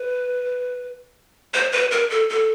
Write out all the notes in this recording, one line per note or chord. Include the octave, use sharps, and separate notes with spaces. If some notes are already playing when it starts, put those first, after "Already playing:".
Already playing: B4
C5
B4
A#4
A4
A4